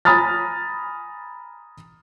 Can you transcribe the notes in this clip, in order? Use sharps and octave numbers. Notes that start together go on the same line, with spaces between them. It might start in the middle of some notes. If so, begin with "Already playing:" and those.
G#5 A#5 B5 D#6 F6 A6